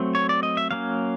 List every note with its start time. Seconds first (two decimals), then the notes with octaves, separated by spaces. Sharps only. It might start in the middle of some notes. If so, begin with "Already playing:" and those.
Already playing: F#3 A3 C4
0.15 C#5
0.29 D5
0.43 D#5
0.57 E5
0.71 F#3 A#3 C#4 F5